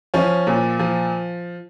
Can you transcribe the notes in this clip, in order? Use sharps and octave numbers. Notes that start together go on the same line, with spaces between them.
F3 C#4
A#2
F3